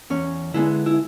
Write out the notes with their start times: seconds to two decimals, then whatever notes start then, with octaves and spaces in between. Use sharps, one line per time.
0.10 E2 C#4
0.54 D3 G#3 B3 E4
0.86 E4